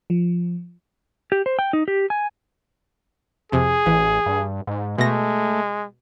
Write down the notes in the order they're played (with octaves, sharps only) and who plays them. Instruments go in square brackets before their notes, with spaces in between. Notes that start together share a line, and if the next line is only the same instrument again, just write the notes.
[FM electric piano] F3
[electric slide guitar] G4
C5
G5
D#4
G4
G#5
[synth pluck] F2 C3 [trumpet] G#4
[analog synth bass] A1 [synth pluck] E3
[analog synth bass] G2
G#2
[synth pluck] B2 A#6 [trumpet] G#3 [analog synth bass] A3